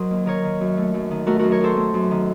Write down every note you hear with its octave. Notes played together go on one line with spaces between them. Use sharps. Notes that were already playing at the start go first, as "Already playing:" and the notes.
Already playing: F#3 A#4 C5 D#5
D#2
D#3 A#4 C#5
D#3
F#2
A3
F#2
D#3
A3 F#4 A#4
F#2 F#4 A#4
A#4 C#5
F#2 A4 C5
A3
F#2
D#3